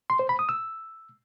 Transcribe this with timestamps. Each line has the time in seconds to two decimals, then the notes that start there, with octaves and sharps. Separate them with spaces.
0.10 C6
0.19 C5
0.29 B5
0.39 D#6
0.49 E6